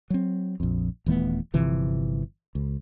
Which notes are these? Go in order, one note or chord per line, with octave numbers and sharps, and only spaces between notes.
F#3 C4
A#1 F2
D#1 E3 A3 B3
G1 C3 E3 F3
C#2